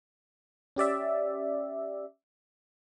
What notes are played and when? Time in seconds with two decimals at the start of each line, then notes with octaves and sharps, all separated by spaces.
0.76 C#4 G4 D5 E5